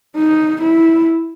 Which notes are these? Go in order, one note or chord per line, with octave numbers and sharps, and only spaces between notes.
D#4
E4